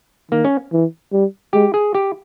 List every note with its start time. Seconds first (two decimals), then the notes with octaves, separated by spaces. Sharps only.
0.31 D#3 A#3
0.45 C#4
0.72 E3
1.12 G3
1.53 G#3 G4
1.74 G#4
1.94 G4